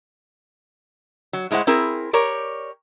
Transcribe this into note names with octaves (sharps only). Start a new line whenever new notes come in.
F#3
A2 G#3 E4 C5 F#5
C4 E4 G#4 A#4
G4 A#4 C#5 D5